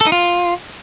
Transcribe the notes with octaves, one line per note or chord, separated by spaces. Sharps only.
A4
D#4
F4